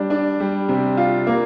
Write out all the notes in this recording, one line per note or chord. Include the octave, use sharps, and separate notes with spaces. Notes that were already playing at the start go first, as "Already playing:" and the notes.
Already playing: G3 D4
D4
G3
C3
F4
A#3